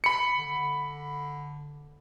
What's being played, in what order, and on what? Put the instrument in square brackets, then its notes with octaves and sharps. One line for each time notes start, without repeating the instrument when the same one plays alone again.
[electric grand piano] B5 C#7
[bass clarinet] D3